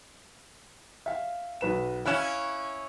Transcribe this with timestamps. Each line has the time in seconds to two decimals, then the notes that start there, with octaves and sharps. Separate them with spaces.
1.06 E5 F5
1.61 B1 B4 E7
2.05 C#4 E4 F5 F#6 E7